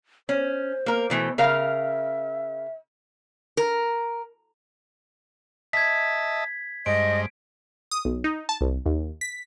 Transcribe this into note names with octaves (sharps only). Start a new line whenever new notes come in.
C#4 C5
A#3 A#4
B2 E3 A3
C#3 A#4 E5 F5
A#4
D#5 E5 A5 G#6 B6
G2 G#3 C5 D#5 D7
D#6
B1
D#4
A5
C2
D#2
B6